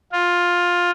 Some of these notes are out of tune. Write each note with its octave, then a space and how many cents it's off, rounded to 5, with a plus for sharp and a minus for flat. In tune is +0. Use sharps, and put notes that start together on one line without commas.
F4 +10